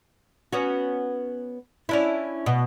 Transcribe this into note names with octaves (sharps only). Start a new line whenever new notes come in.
B3 C#4 F#4
C#4 D4 E4
B2